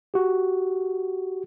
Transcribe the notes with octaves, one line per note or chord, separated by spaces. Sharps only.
F#4 G4